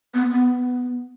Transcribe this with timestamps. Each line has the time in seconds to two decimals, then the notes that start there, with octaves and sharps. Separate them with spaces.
0.14 B3
0.31 B3